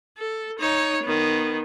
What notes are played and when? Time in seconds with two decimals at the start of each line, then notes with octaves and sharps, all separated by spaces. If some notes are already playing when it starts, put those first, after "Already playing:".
0.18 A4
0.59 D#4 C#5
1.03 D#3 B3